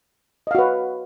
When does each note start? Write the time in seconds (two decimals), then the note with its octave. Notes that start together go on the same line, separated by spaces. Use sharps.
0.47 D#5
0.51 F5
0.55 F#4
0.59 B4